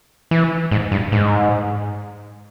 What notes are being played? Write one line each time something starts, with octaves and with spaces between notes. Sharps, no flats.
E3
G#2
G2
G#2